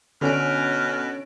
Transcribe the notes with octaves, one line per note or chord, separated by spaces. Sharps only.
B2 D3 C#4 F6 D7